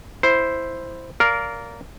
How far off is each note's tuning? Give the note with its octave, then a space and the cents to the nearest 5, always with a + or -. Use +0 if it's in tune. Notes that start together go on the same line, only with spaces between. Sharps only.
E4 +0 C5 +0
A#4 +0 D5 -25 F5 +0